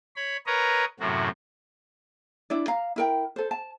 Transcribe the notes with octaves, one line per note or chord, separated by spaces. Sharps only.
C#5 B5
A#4 B4 C#5 D#5 A#5
F#2 A2 C3 F#4
D4 E4 D5
F5 A#5
E4 A#4 G5
A4 C5
A5